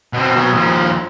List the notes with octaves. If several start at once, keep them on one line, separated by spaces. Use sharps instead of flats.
B2 C4
B2 F#3
D#2 F3